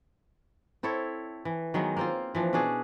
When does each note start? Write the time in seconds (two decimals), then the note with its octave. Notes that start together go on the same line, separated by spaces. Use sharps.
0.83 C4 E4 A4 C#5
1.45 E3
1.74 D#3 F#3 G#3 B3
1.97 A#3 C4 F4
2.35 E3 F3 D4
2.53 B2 C#4 D4 G#4